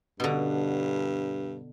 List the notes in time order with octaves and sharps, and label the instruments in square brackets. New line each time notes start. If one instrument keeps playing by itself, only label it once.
[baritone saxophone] G2 [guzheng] B2 D3